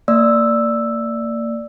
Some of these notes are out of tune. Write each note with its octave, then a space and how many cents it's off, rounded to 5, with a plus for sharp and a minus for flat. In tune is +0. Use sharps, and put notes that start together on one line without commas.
A#3 -25 D5 +0 E6 +0